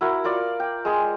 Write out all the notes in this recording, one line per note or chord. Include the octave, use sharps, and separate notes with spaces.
E4 F#4 A#4
F4 A#4 D5 F5
G5
G#3 G#4 C6